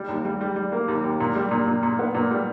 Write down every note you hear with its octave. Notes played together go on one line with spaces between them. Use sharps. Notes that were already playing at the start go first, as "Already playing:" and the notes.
Already playing: G3
D#2
G3
G3
G3
A#3
D#2
D#2
A#2
G3
A#2
A#2
A#2
B3
A#2
G3